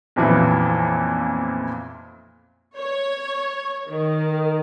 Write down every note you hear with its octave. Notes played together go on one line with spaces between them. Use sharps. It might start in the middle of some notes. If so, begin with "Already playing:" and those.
B1 F2 A#2 E3
C#5
D#3